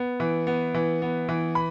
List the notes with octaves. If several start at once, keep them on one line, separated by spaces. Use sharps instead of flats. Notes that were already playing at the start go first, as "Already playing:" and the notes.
Already playing: B3
E3
B3
E3
B3
E3
B5